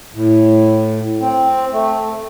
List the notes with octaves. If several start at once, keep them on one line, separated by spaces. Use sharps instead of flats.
A2
C4
A3